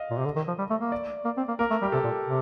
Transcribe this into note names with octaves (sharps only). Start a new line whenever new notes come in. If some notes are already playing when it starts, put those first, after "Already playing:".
Already playing: D#5 F5
A#2
C3
D3
D#3
F3
G3
A3
A#3
D5
A#3
C4
A#3
A#3 A#4
A3
G3 G4
C3 A4
A#2
C3